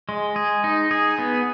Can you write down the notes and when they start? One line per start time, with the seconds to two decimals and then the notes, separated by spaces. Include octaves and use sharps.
0.09 G#3
0.36 G#4
0.64 D#4
0.91 G#4
1.18 B3